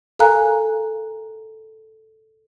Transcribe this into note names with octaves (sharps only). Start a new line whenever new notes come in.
A4 A#4 F5 G#5 A#5 F#6